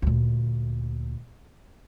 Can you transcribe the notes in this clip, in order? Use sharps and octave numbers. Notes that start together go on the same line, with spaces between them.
D2 A#2